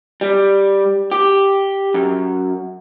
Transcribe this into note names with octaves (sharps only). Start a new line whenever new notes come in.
G3
G4
F#2